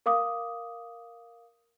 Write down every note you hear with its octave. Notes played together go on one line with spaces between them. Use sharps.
A#4 F5 D6 D#6